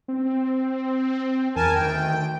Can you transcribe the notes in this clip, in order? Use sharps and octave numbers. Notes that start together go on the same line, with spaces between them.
C4
E2 A#4 G#5 A5
D2 D#3 G5